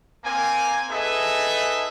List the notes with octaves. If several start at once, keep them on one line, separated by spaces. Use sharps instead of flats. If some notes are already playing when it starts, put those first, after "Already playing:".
A#3 C4 G#5
D#4 G#4 A4 B4 D#5 E5